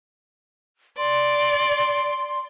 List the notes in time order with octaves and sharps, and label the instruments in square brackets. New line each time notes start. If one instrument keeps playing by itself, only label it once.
[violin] D5 [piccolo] C6